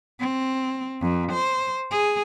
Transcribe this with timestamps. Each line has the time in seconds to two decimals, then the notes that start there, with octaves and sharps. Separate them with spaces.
0.20 C4
1.01 F2
1.33 C5
1.91 G#4